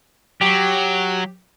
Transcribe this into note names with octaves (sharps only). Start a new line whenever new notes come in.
F#3 G4